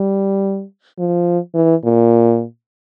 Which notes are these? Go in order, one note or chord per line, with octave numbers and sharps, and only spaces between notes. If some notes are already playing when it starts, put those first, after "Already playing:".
Already playing: G3
F3
E3
A#2